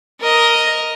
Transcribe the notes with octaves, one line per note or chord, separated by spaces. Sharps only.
A#4 D#5